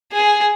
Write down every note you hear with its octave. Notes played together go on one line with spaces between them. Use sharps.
G#4